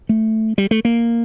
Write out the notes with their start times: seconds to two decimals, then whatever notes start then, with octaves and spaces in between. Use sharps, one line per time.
0.09 A3
0.58 G3
0.71 A3
0.85 A#3